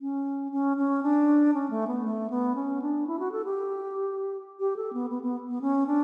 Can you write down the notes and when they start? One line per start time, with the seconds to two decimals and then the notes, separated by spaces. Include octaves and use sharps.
0.01 C#4
0.52 C#4
0.77 C#4
1.03 D4
1.54 C#4
1.70 A3
1.87 B3
2.05 A3
2.30 B3
2.55 C#4
2.82 D4
3.07 E4
3.19 F#4
3.32 A4
3.45 G4
4.60 G4
4.76 A4
4.93 B3
5.10 B3
5.23 B3
5.49 B3
5.61 C#4
5.87 D4